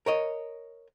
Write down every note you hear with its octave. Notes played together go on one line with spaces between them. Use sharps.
A#4 C#5 D#5